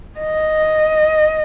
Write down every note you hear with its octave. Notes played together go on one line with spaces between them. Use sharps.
D#5